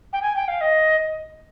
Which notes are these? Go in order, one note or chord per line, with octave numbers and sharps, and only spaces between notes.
G5
G#5
G5
F5
D#5